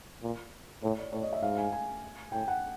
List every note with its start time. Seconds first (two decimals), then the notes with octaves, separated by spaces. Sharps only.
0.23 A#2
0.83 A2 C#5
0.98 D5
1.13 A2 C#5
1.23 D#5
1.33 E5
1.42 G#2 F5
1.57 G#5
1.72 G#5
2.32 A2 G5
2.48 F#5